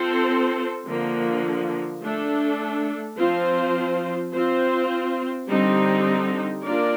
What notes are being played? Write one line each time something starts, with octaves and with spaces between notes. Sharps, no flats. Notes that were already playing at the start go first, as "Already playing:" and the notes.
Already playing: C4 F4 A4 C5
D3 F3 A#3
A3 D4 A4
F3 C4 F4 C5
C4 F4 C5
D3 G3 C4 D#4 G4
A#3 D4 F4 A#4 D5